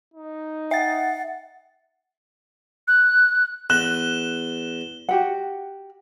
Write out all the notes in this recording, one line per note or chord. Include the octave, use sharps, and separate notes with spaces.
D#4
E5 F#5 A6
F#6
E2 F#6 E7 G7
F#4 G4 F#5